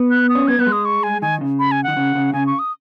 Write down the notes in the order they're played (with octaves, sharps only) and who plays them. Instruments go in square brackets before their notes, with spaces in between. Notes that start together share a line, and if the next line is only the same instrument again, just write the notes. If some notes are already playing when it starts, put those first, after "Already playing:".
Already playing: [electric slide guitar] B3
[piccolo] F#6
D#6
[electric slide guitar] C#4
[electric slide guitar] B3 [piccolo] G#6
[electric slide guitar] B3 [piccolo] F#6
[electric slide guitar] G#3
[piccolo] D#6
C#6
G#5
[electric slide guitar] D#3 [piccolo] G#5
[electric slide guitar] C#3
[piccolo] B5
G#5
[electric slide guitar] D#3 [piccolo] F#5
[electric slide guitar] C#3
C#3
[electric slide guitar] C#3 [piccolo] G#5
[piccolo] C#6
D#6